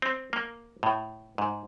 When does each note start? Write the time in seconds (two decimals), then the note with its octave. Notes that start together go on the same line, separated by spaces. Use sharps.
0.02 C4
0.33 A#3
0.83 A2
1.38 G#2